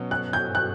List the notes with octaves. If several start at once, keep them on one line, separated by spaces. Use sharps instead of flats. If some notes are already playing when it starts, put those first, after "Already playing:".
Already playing: B2 F#3 C#4
F#6
G6
F#6